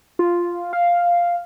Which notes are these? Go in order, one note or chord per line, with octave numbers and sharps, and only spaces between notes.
F4
F5